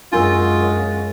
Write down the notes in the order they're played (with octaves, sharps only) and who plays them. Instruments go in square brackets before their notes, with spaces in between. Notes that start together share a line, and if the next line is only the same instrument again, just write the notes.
[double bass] F#2 G#3 [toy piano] D4 A#4 E6 [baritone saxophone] F4